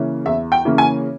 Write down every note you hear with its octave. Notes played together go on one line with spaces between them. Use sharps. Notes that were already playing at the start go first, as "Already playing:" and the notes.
Already playing: C#3 E3 A#3 C#4
E2 E5
G5
C#3 E3 A#3 C#4
G#5